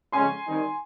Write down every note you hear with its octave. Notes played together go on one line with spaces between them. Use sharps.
F2 C#3 G#3 C#4 G#5 C6
D#3 G3 C4 D#4